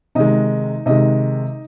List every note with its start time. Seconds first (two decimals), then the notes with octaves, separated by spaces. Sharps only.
0.15 C3 D#3 G#3 D#4 D#5
0.86 C3 D#3 G#3 D#4 D#5